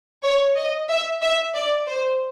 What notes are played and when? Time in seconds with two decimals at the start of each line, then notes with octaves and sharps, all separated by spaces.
0.24 C#5
0.56 D#5
0.89 E5
1.22 E5
1.54 D5
1.87 C5